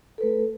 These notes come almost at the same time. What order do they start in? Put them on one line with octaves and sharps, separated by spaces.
A4 B4 A3